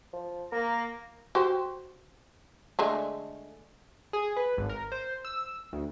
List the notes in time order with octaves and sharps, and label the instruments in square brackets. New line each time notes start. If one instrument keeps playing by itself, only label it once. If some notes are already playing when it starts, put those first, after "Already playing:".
[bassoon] F3
[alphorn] A#3 [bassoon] A#4 [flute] A#6
[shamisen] F#4 G4 C5
D3 G#3 A3
[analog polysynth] G#4
B4
G#1
A#4
C5
E6
D2